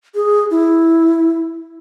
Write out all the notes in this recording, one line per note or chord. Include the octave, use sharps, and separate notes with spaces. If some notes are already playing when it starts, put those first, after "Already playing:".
G#4
E4